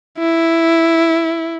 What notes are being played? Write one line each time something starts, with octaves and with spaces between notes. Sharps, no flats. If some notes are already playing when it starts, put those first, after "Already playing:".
E4